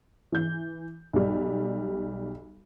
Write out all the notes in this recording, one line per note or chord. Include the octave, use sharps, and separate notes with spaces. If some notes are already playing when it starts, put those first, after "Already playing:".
E3 G6
B1 G3